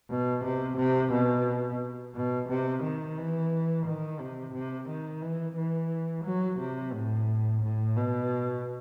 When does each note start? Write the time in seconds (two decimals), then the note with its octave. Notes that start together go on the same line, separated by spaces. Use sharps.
0.10 B2
0.44 C3
0.78 C3
1.12 B2
2.15 B2
2.49 C3
2.83 D#3
3.18 E3
3.86 D#3
4.20 C3
4.54 C3
4.89 D#3
5.22 E3
5.57 E3
6.25 F#3
6.60 C3
6.93 A2
7.62 A2
7.97 B2